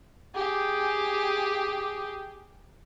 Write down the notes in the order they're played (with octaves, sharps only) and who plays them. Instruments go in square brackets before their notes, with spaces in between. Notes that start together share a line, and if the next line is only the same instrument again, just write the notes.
[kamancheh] G4 G#4